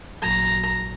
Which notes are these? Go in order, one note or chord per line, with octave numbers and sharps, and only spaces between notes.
A1 A#2 F#3 A#5